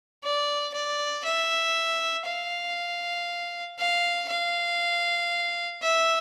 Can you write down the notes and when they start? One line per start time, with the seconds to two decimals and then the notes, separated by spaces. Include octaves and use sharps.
0.24 D5
0.74 D5
1.25 E5
2.26 F5
3.79 F5
4.29 F5
5.82 E5